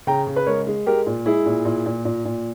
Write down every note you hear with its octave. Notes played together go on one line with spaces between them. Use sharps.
C#3 G5 A#5
C#3
B4
G#3 A#4 C#5
G#3
G#3 G4 A#4
A#2
G#3 E4 G#4
A#2
A#2
A#2
A#2
A#2